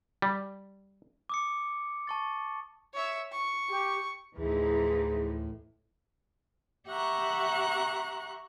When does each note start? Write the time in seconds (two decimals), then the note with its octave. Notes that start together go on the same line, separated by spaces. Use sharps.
0.22 G3
1.29 D6 D#6 C#7
2.07 A5 C#6 A6
2.94 C#5 E5
3.32 C#6
3.69 G4
4.37 D2 A2 E3 F3 D#4 G#4
6.88 G4 E5 F#5 A#5 C#6 F#6